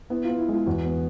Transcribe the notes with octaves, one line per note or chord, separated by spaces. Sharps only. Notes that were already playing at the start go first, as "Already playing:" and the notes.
B3 E4
B3 F4
E4
G#3 F4
E2 F#4
B3